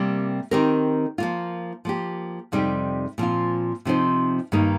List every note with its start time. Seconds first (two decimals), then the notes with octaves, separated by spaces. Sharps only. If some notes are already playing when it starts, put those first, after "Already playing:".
Already playing: C3 G3 A#3
0.51 D#3 C4 G4 A#4
1.18 F3 A#3 F4
1.85 F3 A#3 G4
2.52 F2 C3 G3 D#4 G4
3.18 A#2 F3 C4 F4
3.85 C3 F3 C4 D#4 C5
4.52 G2 D#3 A#3 D#4